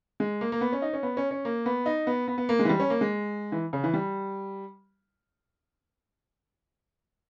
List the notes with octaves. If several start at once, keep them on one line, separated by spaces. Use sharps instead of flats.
G#3
A#3
A#3
B3
C#4
D#4
C#4
B3
C#4
C#4
A#3
B3
D#4
B3
B3
B3
A#3
G#3
E3
G3
C#4
A#3
G#3
E3
C#3
E3
G3